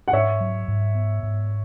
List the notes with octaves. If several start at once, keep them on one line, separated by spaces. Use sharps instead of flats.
F#5
G#2 C#5 E5
F#3
G#2
B3
G#2